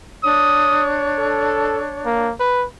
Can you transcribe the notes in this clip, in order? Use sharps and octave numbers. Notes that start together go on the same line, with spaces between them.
D4 C#5 D#6
A4
A#3
B4